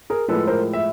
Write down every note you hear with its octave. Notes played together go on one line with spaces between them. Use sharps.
G#4 A#4
A2 F3 G#3 A4 B4
A#4 C5
E5